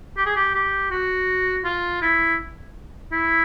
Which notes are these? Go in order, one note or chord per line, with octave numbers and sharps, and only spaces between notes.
G4
G#4
G4
G4
F#4
F4
E4
E4